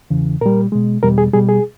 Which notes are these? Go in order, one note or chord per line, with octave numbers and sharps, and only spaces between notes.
E2 C#3 E3
A#2 G3 A#4
B2 G#3
E2 B2 G3 A#4
G#4
B2 G3 G#4
G#4